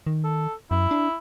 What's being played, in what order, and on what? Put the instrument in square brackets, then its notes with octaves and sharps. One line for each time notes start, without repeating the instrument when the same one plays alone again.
[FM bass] D#3
[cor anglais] A4
[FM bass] F#2 [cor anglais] E4
[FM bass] D4